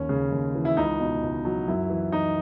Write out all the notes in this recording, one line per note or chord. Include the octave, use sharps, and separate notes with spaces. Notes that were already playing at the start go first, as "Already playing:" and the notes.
Already playing: D#2 C#4
C#3
D#2
E3
E4
C#2 D#4
B2
C#2
F#3
F#2 E4
E3
E3 D#4